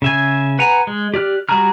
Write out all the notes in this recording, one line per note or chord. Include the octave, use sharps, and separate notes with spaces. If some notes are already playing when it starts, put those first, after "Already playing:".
C#3 E5 G#5
B4 F#5 G#5 A#5
G#3
G4 D5 F6 F#6
G3 F#4 G#4 A#5 F6